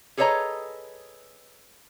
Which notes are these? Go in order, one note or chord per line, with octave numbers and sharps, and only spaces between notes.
G#4 A4 B4 C#5 D#5 A#5